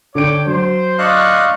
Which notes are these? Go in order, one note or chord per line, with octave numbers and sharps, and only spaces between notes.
D3 C#5 G5 D6 D7
F#3 C5
D4 C5 D#5 F5 C#6 F#6